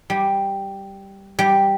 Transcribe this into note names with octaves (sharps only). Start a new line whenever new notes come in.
G3
G3